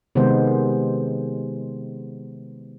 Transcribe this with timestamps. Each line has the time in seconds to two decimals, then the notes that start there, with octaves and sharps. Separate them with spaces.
0.15 C3 D#3 G#3 B3 C5